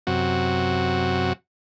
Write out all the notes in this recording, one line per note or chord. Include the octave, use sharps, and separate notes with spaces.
F#2 C3 F#4